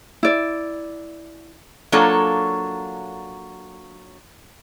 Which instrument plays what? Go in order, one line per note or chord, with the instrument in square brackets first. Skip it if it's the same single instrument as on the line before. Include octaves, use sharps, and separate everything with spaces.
[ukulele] E4 D5
[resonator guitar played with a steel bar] F#3 A#3 D4 F4 A4 C#5